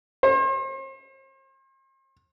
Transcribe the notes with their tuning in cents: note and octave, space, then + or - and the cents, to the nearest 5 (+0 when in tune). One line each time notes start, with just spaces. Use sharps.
C5 +40